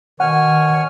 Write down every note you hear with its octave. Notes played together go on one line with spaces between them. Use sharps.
B2 D#3 C#5 F#5 G#5 F6